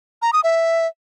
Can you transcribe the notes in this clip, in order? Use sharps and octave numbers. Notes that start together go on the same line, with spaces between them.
A#5
D#6
E5